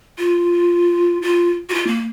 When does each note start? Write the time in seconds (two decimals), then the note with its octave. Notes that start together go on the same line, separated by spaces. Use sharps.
0.19 F4
1.22 F4
1.69 F#4
1.74 F4
1.87 A#3